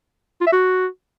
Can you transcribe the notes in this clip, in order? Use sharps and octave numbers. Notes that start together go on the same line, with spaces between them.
F4
E5
F#4